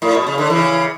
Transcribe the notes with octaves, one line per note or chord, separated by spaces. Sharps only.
A2
B2
C#3
D3
C#3 E3